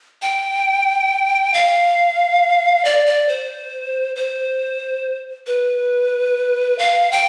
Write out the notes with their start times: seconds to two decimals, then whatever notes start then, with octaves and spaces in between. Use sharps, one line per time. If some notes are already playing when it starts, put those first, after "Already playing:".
0.22 G5
1.54 F5
2.85 D5
3.06 D5
3.28 C5
4.16 C5
5.47 B4
6.79 F5
7.12 G5